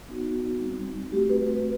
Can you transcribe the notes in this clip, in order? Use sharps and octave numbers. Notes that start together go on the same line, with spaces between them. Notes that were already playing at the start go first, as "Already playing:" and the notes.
B3 D#4 F#4
G3 C4 D#4
A3 C4 F#4 G4
B4
B4